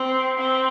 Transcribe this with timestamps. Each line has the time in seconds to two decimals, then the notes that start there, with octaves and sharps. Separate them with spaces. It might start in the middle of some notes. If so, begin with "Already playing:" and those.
Already playing: C4
0.38 C4